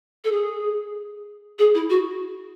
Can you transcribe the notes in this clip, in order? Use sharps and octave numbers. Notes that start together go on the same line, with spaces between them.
A4
G#4
G#4
E4
F#4